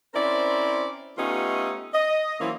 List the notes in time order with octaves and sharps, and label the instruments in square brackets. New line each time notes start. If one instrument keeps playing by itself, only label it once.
[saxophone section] C4 C#4 E4 A#4 C5 D5
A3 B3 C#4 D#4 F4 G4
D#5
E3 F#3 A#3 C4 C#4 E4